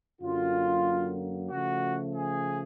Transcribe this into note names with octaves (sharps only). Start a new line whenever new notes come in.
F#2 D3 F#3 A#3 F4
C#3 F3 A3 F#4
G#4